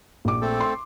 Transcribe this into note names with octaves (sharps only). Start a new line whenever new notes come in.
A#1 D6
A3 C4 A4
C6